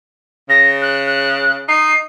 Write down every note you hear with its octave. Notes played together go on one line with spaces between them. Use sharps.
C#3 A#6
F#6
F#6
D#4 C7